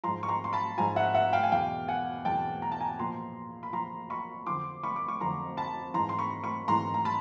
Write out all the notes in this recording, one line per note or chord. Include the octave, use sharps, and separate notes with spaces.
G#2 F3 A#5 C6
C#6
A#5 C6
C6
A5 B5
G#2 F3 G#5 A#5
E5 F#5
E5 F#5
F5 G5
G#5
E2 B2 F5 G5
F#5 G#5
E2 B2 G5 A5
A#5
A5
G#5 A#5
A#2 F3 A#5 C6
B5
A#2 F3 A#5 C6
B5 C#6
F2 D3 F3 C6 D6
B5 C#6
D6
C#6
F2 D3 F3 A#5 C6
A5 B5
G#2 E3 A#5 C6
C6
B5 C#6
B5 C#6
G#2 E3 A#5 C6
A#5
A5 B5